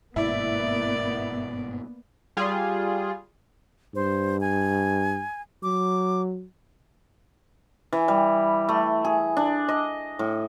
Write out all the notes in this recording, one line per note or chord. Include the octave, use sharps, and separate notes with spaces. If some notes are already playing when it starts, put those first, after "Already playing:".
G1 G#2 B2 A#3 B3 E4 D5
G3 F4 G#4
G2 C5
G#5
F#3 D6
E3
G3
A3
G#4
D4
D#5
A2